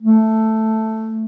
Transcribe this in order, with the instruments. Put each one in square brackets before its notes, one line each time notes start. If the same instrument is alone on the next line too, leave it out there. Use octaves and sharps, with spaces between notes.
[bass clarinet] A3